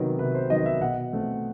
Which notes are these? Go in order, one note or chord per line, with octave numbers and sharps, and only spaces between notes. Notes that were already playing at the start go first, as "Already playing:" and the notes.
Already playing: C3 D#3 F#3 B3
C3 B4
C5
D#3 F#3 B3 D#5
E5
B2 F#5
A3 C4